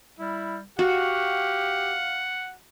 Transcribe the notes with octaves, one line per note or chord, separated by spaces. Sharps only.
G3 E4
F#4 G4 F5 F#5